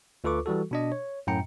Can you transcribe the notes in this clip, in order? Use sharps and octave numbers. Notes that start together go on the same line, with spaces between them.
D2 F4 A4 B4 C#6 D6
E3 G3 F#4 A4
B2 D4 D#5
C#5
F#2 A2 G5 A#5 C#7